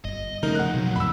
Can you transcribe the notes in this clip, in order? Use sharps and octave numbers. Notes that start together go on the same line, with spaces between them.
G1 D#5
C2 C#3 F3 A3 D#4 A#4
F#5 F#6
B2 F#3 B3
F2 A2 B5 E6